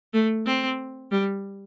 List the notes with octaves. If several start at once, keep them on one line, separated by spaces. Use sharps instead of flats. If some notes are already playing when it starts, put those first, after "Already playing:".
A3
C4
G3